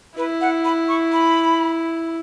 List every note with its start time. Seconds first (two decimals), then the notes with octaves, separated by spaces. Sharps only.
0.17 E4 B4
0.41 F#5
0.65 B5
0.88 C#6
1.12 B5